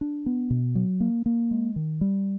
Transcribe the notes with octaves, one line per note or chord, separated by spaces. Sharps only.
D4
B3
B2
F#3
A#3
A#3
G#3
D#3
G3